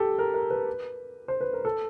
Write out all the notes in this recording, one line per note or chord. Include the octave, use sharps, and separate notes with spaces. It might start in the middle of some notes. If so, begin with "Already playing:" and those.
Already playing: G4 A4
A#4
A#4
B4
C5
B4
A#4
A4